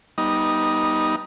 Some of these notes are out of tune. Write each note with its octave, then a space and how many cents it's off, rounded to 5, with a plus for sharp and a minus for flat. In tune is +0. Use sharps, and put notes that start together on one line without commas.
G3 +0 B3 -25 D#4 +0